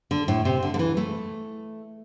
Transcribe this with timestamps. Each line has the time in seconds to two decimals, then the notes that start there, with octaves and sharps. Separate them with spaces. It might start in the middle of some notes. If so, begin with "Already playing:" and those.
0.11 D3
0.28 A2
0.45 C3
0.63 D3
0.74 D3
0.79 E3
0.97 A3